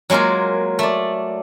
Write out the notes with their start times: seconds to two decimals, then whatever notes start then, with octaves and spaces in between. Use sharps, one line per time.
0.10 F#3 G#3 A#3 F4 A#4
0.79 A3 D5